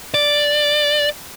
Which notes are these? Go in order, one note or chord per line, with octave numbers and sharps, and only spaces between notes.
D5